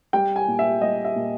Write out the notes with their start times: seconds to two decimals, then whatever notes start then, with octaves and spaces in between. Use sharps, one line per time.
0.13 G3 G5
0.36 G#5
0.48 A#2
0.59 E5
0.82 G3 D#5
1.05 E5
1.16 A#2